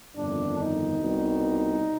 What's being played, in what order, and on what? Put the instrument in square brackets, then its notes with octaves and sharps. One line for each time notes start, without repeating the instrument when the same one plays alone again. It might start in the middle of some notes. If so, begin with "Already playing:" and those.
[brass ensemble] G1 F2 C3 D#3 D4
D#4
C2 B2 G3